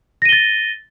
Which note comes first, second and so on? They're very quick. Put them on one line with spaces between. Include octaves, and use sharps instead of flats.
A#6 D#7 G7 A6